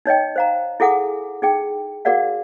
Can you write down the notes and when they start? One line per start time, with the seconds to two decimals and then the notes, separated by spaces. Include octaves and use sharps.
0.06 D#4 C#5 D#5 G5
0.36 C5 F5 A#5
0.80 E4 G#4 A4 F#5 G#5 D6
1.42 D#4 G#4 G5
2.05 F#4 G#4 A#4 D5 F5 F#5